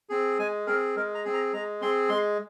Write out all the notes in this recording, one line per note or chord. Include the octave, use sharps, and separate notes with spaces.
C4 G#4
G#3 G#5
C4 G#4 A#4
G#3 A#4
A#5
C4 G#4
A#5
G#3 A#5
C4 G#4 C6
G#3 C6